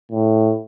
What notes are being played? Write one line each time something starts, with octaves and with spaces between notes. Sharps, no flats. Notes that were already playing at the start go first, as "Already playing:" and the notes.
A2